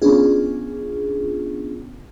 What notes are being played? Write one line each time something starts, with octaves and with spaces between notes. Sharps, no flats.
B3 C#4 D4 F4 G#4